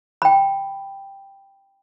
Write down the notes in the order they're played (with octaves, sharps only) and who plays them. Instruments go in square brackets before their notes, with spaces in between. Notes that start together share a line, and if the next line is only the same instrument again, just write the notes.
[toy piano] G5 B5